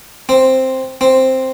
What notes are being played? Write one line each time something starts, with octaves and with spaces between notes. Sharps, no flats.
C4
C4